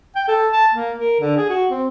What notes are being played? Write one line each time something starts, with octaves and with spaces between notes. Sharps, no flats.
G5
A4
A5
A#3
A#4
D3
G#4
F#4
C4